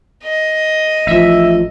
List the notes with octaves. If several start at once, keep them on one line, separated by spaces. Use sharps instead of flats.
D#5
A1 F3 E5